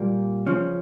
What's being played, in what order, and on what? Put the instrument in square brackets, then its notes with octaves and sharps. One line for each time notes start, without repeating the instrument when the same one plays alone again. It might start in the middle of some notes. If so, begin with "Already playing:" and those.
Already playing: [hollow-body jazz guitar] A#2 G3 A#3
C#3 F3 C#4